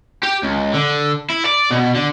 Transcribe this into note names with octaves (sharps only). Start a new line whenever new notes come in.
G4
C#2
D3
E4
D5
B2
D3